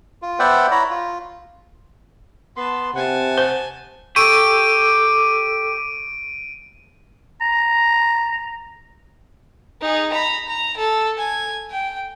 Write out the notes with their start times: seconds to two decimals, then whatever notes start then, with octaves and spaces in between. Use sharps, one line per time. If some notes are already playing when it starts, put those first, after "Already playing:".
0.22 F4
0.39 B3 C5 D5 E5 F#5 G5
0.71 E4 C#5 A#5 B5
0.90 F4
2.57 B3 B4 A5 C6
2.95 C3 F#5 G#5 A5
3.38 C5
4.16 G4 A4 C#6 E6 D7 D#7
7.41 A#5
9.81 D#4 G#4
10.12 A#5 B5
10.48 A#5
10.77 A4
11.17 G#5
11.71 G5